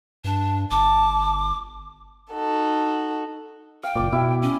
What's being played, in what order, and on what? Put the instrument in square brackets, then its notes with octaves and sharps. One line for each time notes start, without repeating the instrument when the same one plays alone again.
[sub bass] G2 [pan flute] D4
[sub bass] G1 [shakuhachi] A5 [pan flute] D6
[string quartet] D#4 F#4 A4
[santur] F5 [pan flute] G5
[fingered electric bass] F#1 A#2 [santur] D5 D6
[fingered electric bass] B2 [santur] E4 D6
[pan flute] C#4